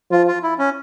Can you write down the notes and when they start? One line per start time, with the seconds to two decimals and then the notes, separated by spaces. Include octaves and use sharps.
0.11 F3 F4
0.28 F4
0.43 E4
0.58 C#4